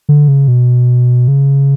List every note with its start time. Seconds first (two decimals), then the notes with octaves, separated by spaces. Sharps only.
0.09 D3
0.28 C#3
0.48 B2
1.28 C#3